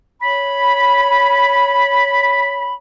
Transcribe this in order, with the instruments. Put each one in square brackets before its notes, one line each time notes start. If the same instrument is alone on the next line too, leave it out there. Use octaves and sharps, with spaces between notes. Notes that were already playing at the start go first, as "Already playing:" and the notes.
[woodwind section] C#5 B5